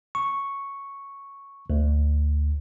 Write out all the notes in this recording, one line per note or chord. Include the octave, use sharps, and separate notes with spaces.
C#6
D2